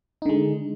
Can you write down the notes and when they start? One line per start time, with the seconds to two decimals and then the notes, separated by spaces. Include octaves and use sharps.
0.22 D#4
0.26 D3
0.29 G#3